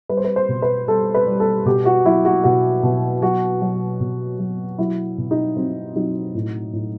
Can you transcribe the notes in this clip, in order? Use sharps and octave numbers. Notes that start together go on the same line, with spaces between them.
G3 B4
C5
B4
C5
B2
B4
G3 A4
B4
G3
A4
B2 G4
F#4
F#3 E4
F#4
B2 F#4
B2
F#3 F#4
F#3
B2
F#3
F#3 E4
B2
D#4
F#3 C4
F#3 D#4
A2
A2